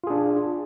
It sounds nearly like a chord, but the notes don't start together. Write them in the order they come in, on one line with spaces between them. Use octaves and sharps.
F4 G#4 D4